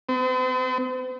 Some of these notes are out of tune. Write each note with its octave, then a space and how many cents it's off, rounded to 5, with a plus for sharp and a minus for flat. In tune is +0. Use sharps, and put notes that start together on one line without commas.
C4 -45